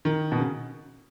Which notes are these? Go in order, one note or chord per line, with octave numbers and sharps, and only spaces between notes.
D#3
B2
C#3